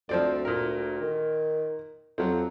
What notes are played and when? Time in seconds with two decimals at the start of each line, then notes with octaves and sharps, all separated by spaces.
0.09 D2 F3 C4 D5
0.45 A#2 A#4
1.01 D#3
2.18 F2 F#3 C4